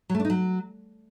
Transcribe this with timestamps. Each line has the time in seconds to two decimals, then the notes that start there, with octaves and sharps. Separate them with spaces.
0.10 F#3
0.15 A3
0.20 D4
0.25 D#4
0.30 F#3